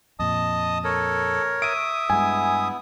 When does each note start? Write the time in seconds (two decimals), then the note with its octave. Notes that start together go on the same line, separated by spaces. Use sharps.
0.19 F2 A#2 D#5 A5 D#6
0.84 A4 A#4 C#5
1.62 E5 D#6 D7 D#7
2.10 G2 G#3 B3 E4 G#5